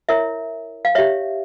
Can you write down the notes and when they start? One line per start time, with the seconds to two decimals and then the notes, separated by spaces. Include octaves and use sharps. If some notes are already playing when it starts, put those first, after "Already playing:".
0.09 E4 A#4 C#5 E5
0.85 F5
0.95 G4 C#5 E5